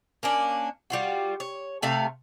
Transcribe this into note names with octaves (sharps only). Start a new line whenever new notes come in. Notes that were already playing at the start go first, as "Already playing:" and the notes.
A#3 C#4 D4
G3 F4 F#4
C#5
C3 A3 E5 F5